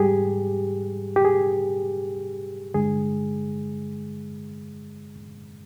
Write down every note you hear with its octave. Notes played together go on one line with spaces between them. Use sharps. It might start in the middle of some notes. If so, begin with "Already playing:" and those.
Already playing: G#2 G3 G4 G#4
G4
G#4
G2 D3 G#3 G#4